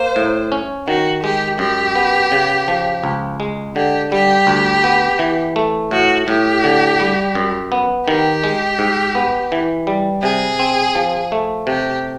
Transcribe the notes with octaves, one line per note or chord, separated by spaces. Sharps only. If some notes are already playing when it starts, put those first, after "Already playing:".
Already playing: A#3 C5
A2
C#4
D#3 F#4
G#3 G4
F#2 G4
B3
C#3
F3
C#2
G#3
D3 G4
G3 G4
D2
B3
E3
A3
A2 F#4
A2 G4
D3
G3
F#2
B3
D#3 G4
G#3
G#2
B3
E3
G3
C3 G#4
C4
F3
A3
C3 G4